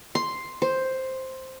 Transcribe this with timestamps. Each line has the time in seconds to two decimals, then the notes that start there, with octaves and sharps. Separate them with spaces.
0.15 C6
0.62 C5